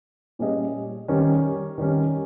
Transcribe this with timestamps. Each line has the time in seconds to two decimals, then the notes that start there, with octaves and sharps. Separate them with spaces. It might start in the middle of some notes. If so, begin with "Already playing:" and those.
0.39 A#2 G3 C#4 G#4 D#5
1.08 D#3 G3 C#4
1.78 D#3 G3 C#4